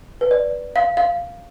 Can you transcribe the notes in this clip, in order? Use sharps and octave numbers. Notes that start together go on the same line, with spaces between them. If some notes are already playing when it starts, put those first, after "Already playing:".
B4
D5
F5
F5